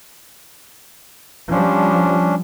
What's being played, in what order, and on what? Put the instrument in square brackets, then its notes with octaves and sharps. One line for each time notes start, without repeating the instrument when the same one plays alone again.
[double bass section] F3 G3 [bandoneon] C#4 D4